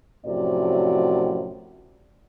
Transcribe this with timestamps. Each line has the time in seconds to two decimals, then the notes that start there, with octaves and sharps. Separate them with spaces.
0.25 F#2 A2 C3 F3 F#4 D5